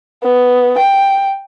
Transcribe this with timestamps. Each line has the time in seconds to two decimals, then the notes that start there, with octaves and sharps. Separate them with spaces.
0.23 B3
0.78 G5